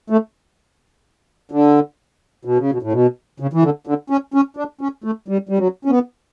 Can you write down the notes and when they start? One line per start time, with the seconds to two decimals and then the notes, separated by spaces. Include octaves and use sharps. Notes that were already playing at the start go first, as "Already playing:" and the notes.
0.10 A3
1.51 D3
2.45 B2
2.58 C#3
2.72 B2
2.82 A2
2.93 B2
3.40 C#3
3.53 E3
3.63 D3
3.87 D3
4.10 C#4
4.34 C#4
4.57 D4
4.81 C#4
5.04 A3
5.28 G3
5.49 G3
5.58 F#3
5.85 C#4
5.90 B3